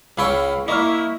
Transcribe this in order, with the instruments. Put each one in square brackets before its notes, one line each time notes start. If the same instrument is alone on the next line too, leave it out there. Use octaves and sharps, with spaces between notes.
[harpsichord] C#2 C#4 G5 [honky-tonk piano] F5 B5 E6
[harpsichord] A#3 [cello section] E4 [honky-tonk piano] D#5 C#6 F6